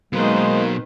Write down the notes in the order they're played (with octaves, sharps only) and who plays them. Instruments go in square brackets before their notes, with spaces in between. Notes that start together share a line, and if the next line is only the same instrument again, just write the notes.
[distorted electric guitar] B2 F#3 [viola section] D#3 B4 C5 [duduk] G#3 [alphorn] A#3